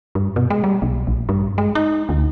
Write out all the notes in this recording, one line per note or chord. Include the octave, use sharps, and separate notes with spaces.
G2
B2
G#3
G3
B1
A#1
G2
G#3
D#4
D2